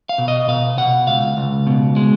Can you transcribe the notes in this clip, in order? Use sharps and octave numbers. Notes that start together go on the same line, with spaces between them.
F5
B2
D#5
B2 F5
B2 F#5
C#2 F5
C#2
B2
G#3